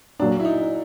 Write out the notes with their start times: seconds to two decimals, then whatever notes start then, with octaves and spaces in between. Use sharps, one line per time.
0.20 A#2 F#3 A#3 D4
0.40 E4
0.45 D#4